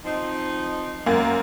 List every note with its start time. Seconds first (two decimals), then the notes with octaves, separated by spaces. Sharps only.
0.04 F3 C4 D#4
1.06 F#2 A#3